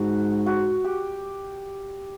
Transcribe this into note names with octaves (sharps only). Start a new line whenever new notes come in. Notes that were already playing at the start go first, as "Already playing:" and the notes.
Already playing: G#2 F#4
F#4
G4